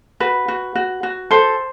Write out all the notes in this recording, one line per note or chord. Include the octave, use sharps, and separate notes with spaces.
F#4 B4
F#4
F#4
F#4
A4 C5